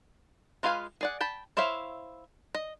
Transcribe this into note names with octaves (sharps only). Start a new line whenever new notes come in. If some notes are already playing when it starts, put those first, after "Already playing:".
G#3 F4 B4 F5 G#5
G#4 D5 F#5
G5 A5 B5
E4 C5 C#5 E5 F5
D#5